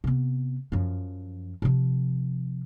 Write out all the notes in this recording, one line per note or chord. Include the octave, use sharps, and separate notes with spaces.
C3 B3
F#2 F3
C3 F3